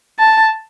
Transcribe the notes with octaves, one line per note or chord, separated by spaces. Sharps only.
A5